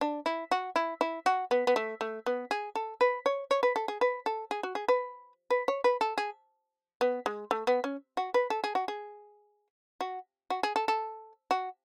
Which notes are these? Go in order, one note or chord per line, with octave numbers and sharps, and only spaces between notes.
D4
E4
F#4
E4
E4
F#4
B3
B3
A3
A3
B3
G#4
A4
B4
C#5
C#5
B4
A4
G#4
B4
A4
G#4
F#4
G#4
B4
B4
C#5
B4
A4
G#4
B3
G#3
A3
B3
C#4
F#4
B4
A4
G#4
F#4
G#4
F#4
F#4
G#4
A4
A4
F#4